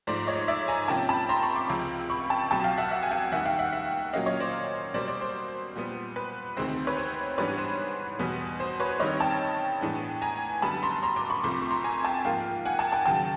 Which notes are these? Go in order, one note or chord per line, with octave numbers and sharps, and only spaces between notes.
G#2 F3 A3 C5 D5
C#5 D#5
D5 E5
G#5 A#5
C3 F3 A#3 C#4 G5 A5
A5 B5
A#5 C6
B5 C#6
C6 D6
C#2 C3 F3 G#3 C4
B5 C#6
G5 A5
C2 B2 F#3 G5 A5
F5 G5
E5 F#5
E5 F#5
G#5
F5 G5
D#2 D#3 G3 E5 F#5
F5 G5
E5 F#5
E5 F#5
A#2 F#3 A#3 C#4 D#5 F5
C#5 D#5
C5 D5
B2 G3 A#3 C5 D5
C5 D5
C5
A#2 G3 B3
B4
D2 C3 D#3 G#3 C4 C5
B4 C#5
C5
G#2 E3 G3 B3 D4 B4 C#5
C5
E2 B2 G3 B3
C5
B4 C#5
G2 D#3 G3 C4 C#5 D#5
G5 A5
A2 E3 G#3 B3 D4
G#5 A#5
F#2 D3 G3 B3 A5 B5
A#5 C6
A#5 C6
C6 D6
B5 C#6
C2 C3 F3 A3 C6 D6
C#6
A#5 C6
G#5 A#5
G5 A5
G#2 F3 A#3 F5 G5
F#5 G#5
G5 A5
G5 A5
D#2 C#3 F#3 G5 A5